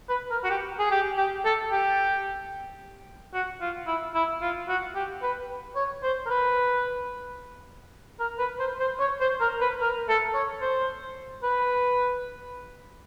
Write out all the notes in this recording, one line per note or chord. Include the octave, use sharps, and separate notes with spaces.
B4
A#4
F#4
G4
G#4
G4
G4
A4
G4
F#4
F4
E4
E4
F4
F#4
G4
B4
C#5
C5
A#4
B4
A#4
B4
C5
C5
C#5
C5
A#4
B4
A#4
A4
C#5
C5
B4